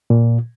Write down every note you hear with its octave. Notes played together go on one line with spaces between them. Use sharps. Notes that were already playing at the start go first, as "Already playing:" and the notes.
A#2